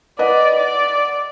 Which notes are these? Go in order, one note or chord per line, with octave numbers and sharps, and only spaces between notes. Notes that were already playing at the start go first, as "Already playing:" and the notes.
B4 D5 D#5 F#5
D5